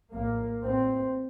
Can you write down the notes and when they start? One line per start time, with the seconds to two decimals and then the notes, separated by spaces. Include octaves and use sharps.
0.12 A#1 A2 A#3
0.63 A1 A2 C4